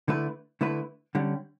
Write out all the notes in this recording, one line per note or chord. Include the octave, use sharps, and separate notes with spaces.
D3 A3 E4 B4
D3 A3 E4 B4
D3 G3 C#4